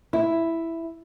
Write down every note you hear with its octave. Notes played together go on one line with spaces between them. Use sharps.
E4